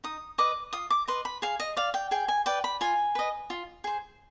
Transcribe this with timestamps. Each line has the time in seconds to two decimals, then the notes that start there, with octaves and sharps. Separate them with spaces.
0.04 D#4 D#6
0.38 B4 D#5 D6
0.73 F4 D#6
0.90 D6
1.08 B4 D#5 C6
1.25 B5
1.42 G#4 F5
1.60 D#5
1.77 D5 F5
1.94 G5
2.11 G#4 G5
2.28 G#5
2.46 B4 D5 G5
2.64 B5
2.81 F4 G#5
3.15 B4 D#5
3.50 F4
3.84 G#4 C5